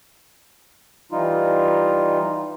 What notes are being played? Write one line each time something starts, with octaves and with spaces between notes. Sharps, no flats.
E3 G3 D#4 F4